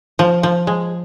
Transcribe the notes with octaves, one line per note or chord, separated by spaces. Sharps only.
F3
F3
G#3